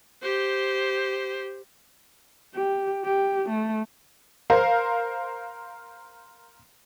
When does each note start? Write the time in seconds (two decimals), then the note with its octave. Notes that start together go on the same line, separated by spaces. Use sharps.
0.23 G4 C5
2.55 G4
3.05 G4
3.49 A3
4.50 A#4 C5 F5